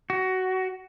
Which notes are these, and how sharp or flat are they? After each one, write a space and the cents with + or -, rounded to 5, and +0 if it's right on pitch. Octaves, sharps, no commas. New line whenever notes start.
F#4 +20